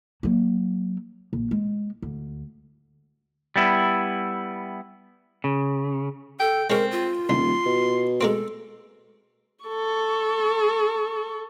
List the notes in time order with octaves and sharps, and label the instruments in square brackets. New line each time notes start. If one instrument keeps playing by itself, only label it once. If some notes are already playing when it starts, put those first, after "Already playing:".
[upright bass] F#3 A#3
A#1
G#3
D2
[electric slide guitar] G3 B3 E4
C#3
[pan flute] A4 [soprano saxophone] G5
[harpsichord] G#3 C#4 [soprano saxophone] C4 [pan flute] A#4
[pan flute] F4
[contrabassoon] D#1 [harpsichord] C2 [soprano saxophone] C6
[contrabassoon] B2
[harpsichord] G#3 A#3 C4 [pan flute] A4
[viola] A4 C#6